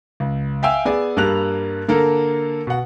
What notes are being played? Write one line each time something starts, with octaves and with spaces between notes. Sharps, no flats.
C#2
E5 F5 G5 G#5 E6
B3 G#4 D5 G#5
G2 G3 A#3 F#6 F7
D3 A#3 A4 A#4
B2 F#5